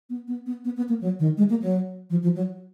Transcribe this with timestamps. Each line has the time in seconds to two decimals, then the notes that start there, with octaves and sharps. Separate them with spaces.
0.10 B3
0.28 B3
0.46 B3
0.65 B3
0.77 B3
0.89 A#3
1.01 F#3
1.19 D#3
1.37 G#3
1.50 A#3
1.62 F#3
2.10 F3
2.23 F3
2.35 F#3